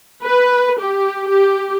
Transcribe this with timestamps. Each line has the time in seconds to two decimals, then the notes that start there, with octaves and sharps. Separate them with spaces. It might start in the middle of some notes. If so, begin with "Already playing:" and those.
0.22 B4
0.80 G4
1.28 G4